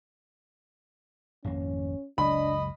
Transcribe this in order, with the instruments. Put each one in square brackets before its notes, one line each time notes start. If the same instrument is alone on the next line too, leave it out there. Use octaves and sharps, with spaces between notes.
[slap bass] G#1 F2 A#3 [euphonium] C#4
[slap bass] F#1 C#2 F#3 [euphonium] D4 [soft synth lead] D#5 [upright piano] B5